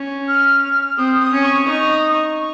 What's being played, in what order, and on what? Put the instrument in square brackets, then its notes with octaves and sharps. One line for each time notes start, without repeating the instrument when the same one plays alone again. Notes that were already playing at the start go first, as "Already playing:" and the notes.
Already playing: [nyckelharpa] C#4
[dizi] F6
[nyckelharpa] C4 [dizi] D#6
[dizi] D#6
[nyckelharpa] C#4
[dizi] C#6
[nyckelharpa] D#4 [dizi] C#6
[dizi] D#6
C#6